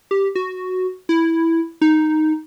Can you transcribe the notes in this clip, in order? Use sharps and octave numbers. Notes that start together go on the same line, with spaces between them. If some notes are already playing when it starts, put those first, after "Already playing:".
G4
F#4
E4
D#4